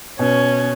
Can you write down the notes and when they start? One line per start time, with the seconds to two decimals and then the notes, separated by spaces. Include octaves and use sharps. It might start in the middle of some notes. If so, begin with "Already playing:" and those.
0.19 B2 C#4